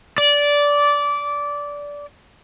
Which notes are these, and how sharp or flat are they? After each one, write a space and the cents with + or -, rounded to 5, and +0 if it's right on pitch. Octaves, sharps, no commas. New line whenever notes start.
D5 -15